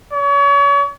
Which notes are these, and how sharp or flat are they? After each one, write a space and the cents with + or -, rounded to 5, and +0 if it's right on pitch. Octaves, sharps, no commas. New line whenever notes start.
C#5 +35